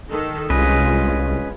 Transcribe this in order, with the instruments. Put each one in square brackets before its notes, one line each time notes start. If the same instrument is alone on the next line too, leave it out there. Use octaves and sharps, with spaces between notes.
[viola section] D#3 A4
[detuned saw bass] C2 [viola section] G#3 F4 [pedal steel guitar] C#4 B4 D#5